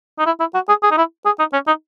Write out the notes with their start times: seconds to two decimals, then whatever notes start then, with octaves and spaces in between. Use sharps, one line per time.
0.18 D#4
0.26 E4
0.40 E4
0.54 F#4
0.69 G#4
0.83 G#4
0.91 D#4
0.97 E4
1.25 G#4
1.39 D#4
1.53 C#4
1.67 D#4